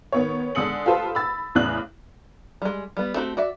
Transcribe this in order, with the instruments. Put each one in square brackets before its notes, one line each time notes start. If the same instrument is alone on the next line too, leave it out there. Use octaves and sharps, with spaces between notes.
[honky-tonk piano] D#3 B3 C#5
D3 G#3 D#6 C#7 F#7
F4 G4 A4 B4 C5 A5
B5 E6 A6
E2 A2 C#3 D5 F#6 F#7
[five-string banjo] G3 G#3
G3 B3
A3 C4 F#4 G4
F#4 D5 E5